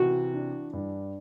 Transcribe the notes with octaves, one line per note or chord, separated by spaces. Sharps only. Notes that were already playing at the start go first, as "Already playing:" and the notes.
Already playing: C3 E3 F#4
D4
G2